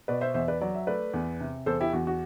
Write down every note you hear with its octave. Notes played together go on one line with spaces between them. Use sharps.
B2 B4 D5
C5 E5
E2 C5 E5
B4 D5
F#3 D5
E5
A3 B4 D5
E2
C3
E2 A4 C5
E4 G4
E2 F#4
F#4